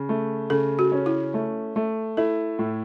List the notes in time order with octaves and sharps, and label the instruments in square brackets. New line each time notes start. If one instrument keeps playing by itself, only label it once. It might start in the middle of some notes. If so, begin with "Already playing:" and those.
Already playing: [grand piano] C#3
A3
[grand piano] C#3 [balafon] A4
[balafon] F#4
[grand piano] C#4
[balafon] E4
[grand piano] A3
A3
[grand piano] E4 [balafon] A4
[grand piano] A2